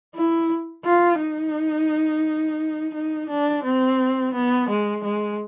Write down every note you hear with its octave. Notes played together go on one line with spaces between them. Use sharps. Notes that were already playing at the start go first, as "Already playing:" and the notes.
E4
F4
D#4
D#4
D4
C4
B3
G#3
G#3